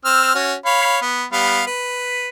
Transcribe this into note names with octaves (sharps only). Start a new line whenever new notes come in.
C4 E6 F6
C#4 F#4
C#5 F5 B5
B3
G3 B3 F5
B4